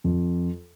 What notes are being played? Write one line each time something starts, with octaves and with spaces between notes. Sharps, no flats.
F2